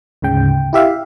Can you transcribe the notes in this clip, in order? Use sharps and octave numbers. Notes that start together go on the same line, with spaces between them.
D2 G#2 C#3 G5
E4 G4 E5 F5